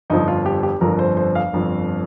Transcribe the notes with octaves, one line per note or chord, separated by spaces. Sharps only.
G1 F2 F3 D#4
F4
G4
G4
G1 F2 F3 A#4
C5
C5
F5
G1 F2 F3